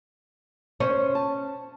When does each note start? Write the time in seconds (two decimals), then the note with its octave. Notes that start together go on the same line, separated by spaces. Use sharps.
0.80 C#4 C5
1.15 A5